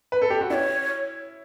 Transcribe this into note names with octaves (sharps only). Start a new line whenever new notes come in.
B4
A4
G4
F#4
E4 C#5 D5